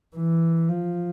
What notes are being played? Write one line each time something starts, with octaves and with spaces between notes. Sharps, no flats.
E3
F3